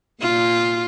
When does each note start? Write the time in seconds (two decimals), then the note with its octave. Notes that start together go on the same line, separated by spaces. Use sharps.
0.21 A#2 F4